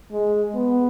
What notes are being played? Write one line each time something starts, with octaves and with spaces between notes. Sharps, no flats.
G#3
B3